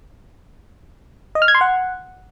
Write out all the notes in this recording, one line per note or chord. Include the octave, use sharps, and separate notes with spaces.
D#5
F6
G#6
C6
F#5